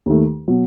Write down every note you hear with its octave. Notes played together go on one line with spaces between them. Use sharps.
D#2 D#3 A3
B2 F#3